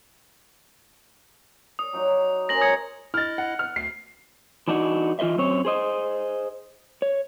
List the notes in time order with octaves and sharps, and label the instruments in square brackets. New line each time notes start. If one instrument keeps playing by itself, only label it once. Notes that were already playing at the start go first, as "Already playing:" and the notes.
[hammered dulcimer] D5 [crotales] D#6
[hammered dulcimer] F#3 D#4 F#4
[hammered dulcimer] C#4 A#4 C5 [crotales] A#6 F#7
[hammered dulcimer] G#3 A#5 [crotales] D#6 G#6 C#7
[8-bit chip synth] E4 D#5 [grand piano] F6 A6
[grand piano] F#5
[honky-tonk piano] F6
[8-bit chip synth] D2 [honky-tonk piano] C7
[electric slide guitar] E3 D4 D#4 F#4
E3 F4 C5 D#5 E5
F#2 C4 C#5
G#4 C5 D#5
C#5